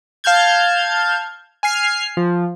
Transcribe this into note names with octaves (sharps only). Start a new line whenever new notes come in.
F5 A5 F6 G6 G#6
G#5 F6 C7
F3